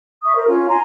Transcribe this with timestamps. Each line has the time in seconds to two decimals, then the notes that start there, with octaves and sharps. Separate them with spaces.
0.23 E5 C#6 D#6
0.35 A#4 C5
0.47 C#4 F4
0.68 G#5 A#5 C6